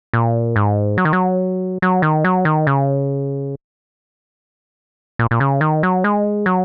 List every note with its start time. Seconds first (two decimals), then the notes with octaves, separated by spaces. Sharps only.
0.13 A#2
0.56 G#2
0.98 F#3
1.05 D#3
1.13 F#3
1.82 F#3
2.02 D#3
2.24 F#3
2.45 D#3
2.67 C#3
5.19 A#2
5.31 A#2
5.40 C#3
5.61 D#3
5.83 F#3
6.04 G#3
6.46 F#3